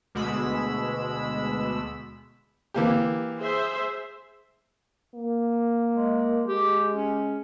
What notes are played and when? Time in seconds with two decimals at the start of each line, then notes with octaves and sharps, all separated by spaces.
0.15 D2 B2 G#3 B5 E6
2.74 E3 A#3 G4
3.40 G#4 C5 E5
5.14 A#3
5.94 G#3
6.46 G#3 G4
6.93 C#4